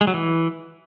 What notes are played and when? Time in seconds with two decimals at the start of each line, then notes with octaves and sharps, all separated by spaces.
0.01 G#3
0.07 F#3
0.14 E3